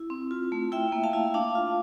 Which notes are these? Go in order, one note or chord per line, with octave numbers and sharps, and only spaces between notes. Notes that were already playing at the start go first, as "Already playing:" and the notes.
Already playing: E4
C4
F4
A3
E4 E5 G5
A#3
F5 A5
E4
D4 F5 A5
F4